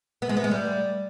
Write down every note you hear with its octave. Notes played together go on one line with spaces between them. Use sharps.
B3
G#3
B3
G#3
G3